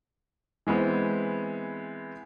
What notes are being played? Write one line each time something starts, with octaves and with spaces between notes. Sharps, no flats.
E3 G#3 B3 C4